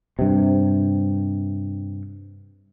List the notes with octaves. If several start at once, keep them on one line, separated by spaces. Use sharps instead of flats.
G2 C3